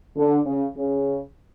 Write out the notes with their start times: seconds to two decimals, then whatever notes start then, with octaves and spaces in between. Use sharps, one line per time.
0.17 D3
0.46 C#3
0.76 C#3